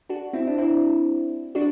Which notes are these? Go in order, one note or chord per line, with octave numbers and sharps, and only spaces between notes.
D4 F#4
C4 E4
D4
C4 E4
D4 F#4